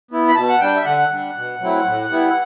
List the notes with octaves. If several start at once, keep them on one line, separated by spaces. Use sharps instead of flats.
B3 E4
B5
B2 A5
F#5
G3 D4 G5
E5
D3 F#5
G3 D4
B2
F#3 A3 C4 E4
A2
G3 B3 E4